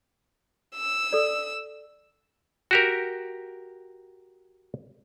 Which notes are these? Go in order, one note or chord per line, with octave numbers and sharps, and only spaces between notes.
E6
A4 D5
F#4 G4 A#4